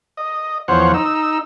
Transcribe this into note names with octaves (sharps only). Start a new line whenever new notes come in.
D#5
E2 F3 C5 C#5 F#5
D#4 E6